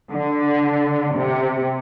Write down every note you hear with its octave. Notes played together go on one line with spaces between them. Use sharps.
D3
C3